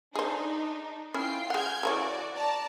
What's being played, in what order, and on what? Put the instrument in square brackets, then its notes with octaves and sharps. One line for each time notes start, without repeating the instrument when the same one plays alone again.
[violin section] D4 D#4 [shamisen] G#4 C5
[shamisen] C#4 E4 [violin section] F4 G5 C7
[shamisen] G#3 F#5 [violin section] F6 G6 G#6
[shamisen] C#3 E3 C#5 [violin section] F#4 D5
[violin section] D5 A5 A#5